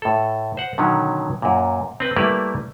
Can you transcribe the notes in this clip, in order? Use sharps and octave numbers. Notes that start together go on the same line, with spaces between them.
A2 A4
C5 F#5
B2 D3 D#3 F#3 C#4
F#2 A#2
C4 B4
G3 A3 A#3 E4 A#4 B4